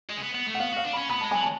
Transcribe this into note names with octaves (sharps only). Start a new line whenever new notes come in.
G#3
C#4
B3
B3
A3
F#5
B3 F5
F#4 F5
D4
C#4 B5
B3 B5
G#3 A5
F#3 G#5
A5